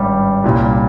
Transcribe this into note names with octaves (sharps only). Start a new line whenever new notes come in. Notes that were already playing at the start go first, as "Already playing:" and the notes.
Already playing: G#1 G2 G3 C#4 G4
C2 A#2 G3 C#4